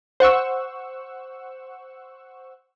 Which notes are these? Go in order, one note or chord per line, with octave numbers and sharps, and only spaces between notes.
C5 F#5 C#6 E6